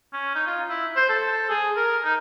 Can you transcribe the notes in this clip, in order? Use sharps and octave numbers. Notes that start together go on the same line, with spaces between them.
C#4
D#4
F4
E4
C5
A4
G#4
A#4
D#4